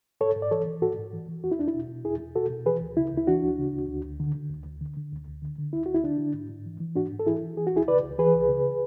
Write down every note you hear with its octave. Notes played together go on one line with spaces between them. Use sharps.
G#2 A4 C#5
G#2
D5
E3 A4 C#5
E3
G#2 F#4 A4
G#2
E3
E3
E2 F#4
E4
E2 D4
E4
B2
B2
E2 E4 G#4
E2
B2 F#4 A4
B2
E3 G#4 B4
D2
C#3 E4
D2 E4
E3 D4 F#4
D2
C#3
D2
D2
D2
D3
D3
D2
D2
D3
D3
D2
D2
D3
D3
D2 E4
D2 F#4
E4
D3 D4
D3
G#2
G#2
E3
E3
G#2 D4 F#4
G#2
A4
E3 E4 G#4
E3
E3 G#4
F#4
C#2 E4 G#4
C#3 B4 D5
C#2
E3 G#4 B4
C#2
C#3